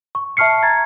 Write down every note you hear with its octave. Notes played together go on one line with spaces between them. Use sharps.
C#6
E5 A5 C#6 F6 C7 C#7
A#5 G#6 A6